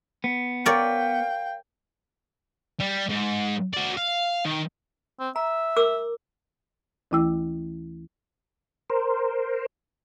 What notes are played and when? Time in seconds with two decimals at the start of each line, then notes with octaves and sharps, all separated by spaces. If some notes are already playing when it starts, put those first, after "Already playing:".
0.24 B3
0.66 A#4 C#5 D5 F5 G5
2.80 G3
3.09 G#2
3.73 F#4 D5
3.97 F5
4.45 D#3
5.20 C4
5.36 E5 A#5
5.77 A#4 D6 E6
7.11 D2 E3 A3 E4 G5 E6
8.90 A#4 C5